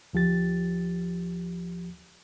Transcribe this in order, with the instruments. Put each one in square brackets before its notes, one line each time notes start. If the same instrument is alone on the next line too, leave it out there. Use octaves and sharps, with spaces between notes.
[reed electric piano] D2 F3 G4 A6